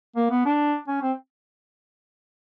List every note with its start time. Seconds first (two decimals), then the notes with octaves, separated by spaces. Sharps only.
0.16 A#3
0.31 B3
0.45 D4
0.88 C#4
1.02 C4